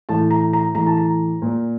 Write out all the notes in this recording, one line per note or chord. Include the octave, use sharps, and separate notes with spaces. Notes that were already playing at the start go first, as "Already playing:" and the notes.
A2 E3 A5
A#5
A#5
A2 E3 A#5
A5
A#5
A#2